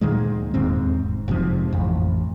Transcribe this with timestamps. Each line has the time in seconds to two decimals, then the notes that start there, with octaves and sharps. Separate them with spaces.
0.01 D2 A#2 D#3 G#3
0.54 E1 D#2 G#2 C4
1.28 F1 G#2 C3 F3
1.73 A1 F2